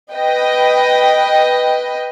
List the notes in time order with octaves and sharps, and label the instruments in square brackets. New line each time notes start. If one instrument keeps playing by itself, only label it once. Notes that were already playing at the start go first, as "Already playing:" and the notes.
[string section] B4 D#5 G5